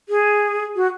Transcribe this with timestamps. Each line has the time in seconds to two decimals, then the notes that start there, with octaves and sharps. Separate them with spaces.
0.09 G#4
0.76 F#4